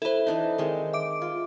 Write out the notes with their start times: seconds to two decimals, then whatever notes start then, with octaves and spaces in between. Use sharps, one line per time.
0.02 E4 A4 B4 C5
0.27 E3 D4 D#4
0.58 D#3 G#3 C4
0.93 E5 D6 D7
1.22 F4